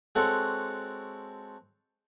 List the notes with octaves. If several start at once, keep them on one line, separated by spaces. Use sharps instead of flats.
G#3 C4 F#4 A4 C#5 F#5